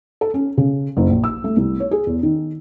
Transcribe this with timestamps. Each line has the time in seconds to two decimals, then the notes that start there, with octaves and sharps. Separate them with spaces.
0.21 A4
0.34 C#4
0.57 C#3
0.97 F#1
1.09 A#1
1.24 E6
1.44 A3
1.56 C2
1.80 C#5
1.91 G#4
2.07 E2
2.23 D#3